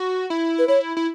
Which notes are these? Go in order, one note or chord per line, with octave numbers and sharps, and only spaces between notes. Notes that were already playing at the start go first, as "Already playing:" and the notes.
Already playing: F#4
E4
B4
E4 C#5
E4